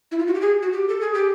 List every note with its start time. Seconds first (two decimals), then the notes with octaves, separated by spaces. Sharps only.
0.12 E4
0.19 F4
0.27 F#4
0.34 G4
0.41 G#4
0.62 F#4
0.73 G4
0.89 A4
1.01 G#4
1.14 G4